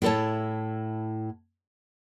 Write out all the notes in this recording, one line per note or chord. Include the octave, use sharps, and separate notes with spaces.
A2 E4 A4 A#4 C#5 A5